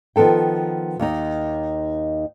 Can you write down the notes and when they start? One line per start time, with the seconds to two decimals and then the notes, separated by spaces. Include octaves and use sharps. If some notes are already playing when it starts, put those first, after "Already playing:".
0.16 D#3 F3 B3 A4 G5
1.00 D#2 D#4